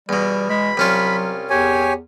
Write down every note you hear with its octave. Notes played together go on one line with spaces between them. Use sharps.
E2 B2 G3
G#3 B5
C2 F#3 C#4 F4
E2 G4 C#5 G#5